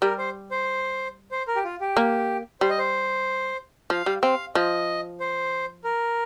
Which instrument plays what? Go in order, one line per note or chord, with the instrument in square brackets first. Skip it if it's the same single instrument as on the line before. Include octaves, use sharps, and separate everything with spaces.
[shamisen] G3 [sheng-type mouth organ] A#4
[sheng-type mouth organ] C5
C5
C5
A#4
G4
F4
G4
[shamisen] A#3
[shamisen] G3 [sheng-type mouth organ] C5
[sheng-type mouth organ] D#5
C5
[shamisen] F3 [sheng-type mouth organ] F5
[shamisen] G3
[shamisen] C4 [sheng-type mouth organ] F5
[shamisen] F3 [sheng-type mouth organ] D#5
[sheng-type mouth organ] C5
A#4